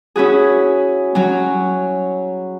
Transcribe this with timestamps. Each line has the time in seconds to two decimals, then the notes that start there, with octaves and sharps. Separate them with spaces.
0.16 C#4 E4 F#4 G#4
1.15 F#3 C#4